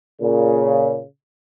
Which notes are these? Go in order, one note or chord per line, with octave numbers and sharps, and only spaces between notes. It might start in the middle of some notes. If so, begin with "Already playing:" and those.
A#2 C#3